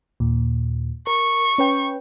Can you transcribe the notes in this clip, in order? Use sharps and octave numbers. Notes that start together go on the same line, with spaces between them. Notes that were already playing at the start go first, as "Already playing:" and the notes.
D#2 A#2
A#4 C#6
C#4 B4 G5